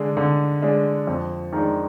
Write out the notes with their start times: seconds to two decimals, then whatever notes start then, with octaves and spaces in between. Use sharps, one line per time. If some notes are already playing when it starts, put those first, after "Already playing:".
Already playing: D3 G#3 D4
0.17 D3
0.62 G#3 D4
1.07 F2
1.53 D#3 G#3 D4